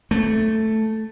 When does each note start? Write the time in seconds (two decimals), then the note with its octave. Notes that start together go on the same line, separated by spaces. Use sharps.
0.11 A3